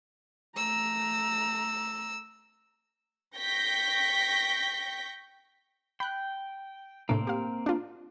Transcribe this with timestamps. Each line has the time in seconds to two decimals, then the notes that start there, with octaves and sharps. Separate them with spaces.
0.57 A3 A#5 E6
3.38 G5 C#6 G6 A#6 B6
6.00 G5 B5 F#6
7.09 A2 C3 A#3 C4 D4
7.27 G4 F5
7.66 D4 F4